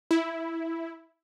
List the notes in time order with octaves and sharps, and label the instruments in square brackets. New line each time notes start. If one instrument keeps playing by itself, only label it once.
[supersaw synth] E4